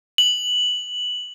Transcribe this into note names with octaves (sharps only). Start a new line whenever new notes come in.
F#7